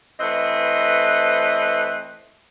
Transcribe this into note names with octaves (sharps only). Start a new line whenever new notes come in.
E3 A3 C4 B4 D#5